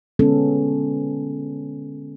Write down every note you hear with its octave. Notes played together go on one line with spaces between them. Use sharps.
D3 G#3 B3 C#4 A4